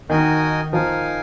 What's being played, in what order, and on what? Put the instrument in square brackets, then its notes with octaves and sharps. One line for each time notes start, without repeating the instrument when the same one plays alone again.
[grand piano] D#3 [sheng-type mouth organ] D#4 F#4 A#4 D#5 G#5
[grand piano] F3 [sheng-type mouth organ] D#4 A#4 F5 G#5